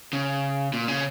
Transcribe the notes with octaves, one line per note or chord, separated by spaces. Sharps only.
C#3
A#2
C#3